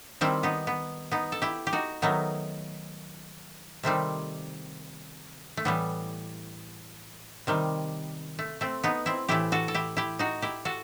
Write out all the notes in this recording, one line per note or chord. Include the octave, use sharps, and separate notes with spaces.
D#3 G3 C4 E4
B3 D#4
B3
B3 D#4
A4
E4 G4
G4
D#4 F#4
D#3 F#3 A3 B3 D#4
C3 D#3 G3 A3 C4
A3
A2 E3 G3 B3
C3 D#3 G3
A3
A3 C4
B3 D#4
C4 E4
A2 E3 A3 E4 G4
F#4 A4
A4
E4 G4
E4 G4
D#4 F#4
E4 G4
F#4 A4